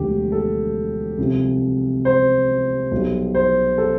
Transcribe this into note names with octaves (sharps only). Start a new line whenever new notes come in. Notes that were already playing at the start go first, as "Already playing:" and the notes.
Already playing: E1 D2 D3 F3 G4
A4
C2 C3 F3
C5
B1 B2 G3
C5
A4